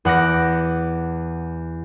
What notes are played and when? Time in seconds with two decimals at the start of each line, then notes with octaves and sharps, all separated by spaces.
0.05 E2 F#5 D6 A#6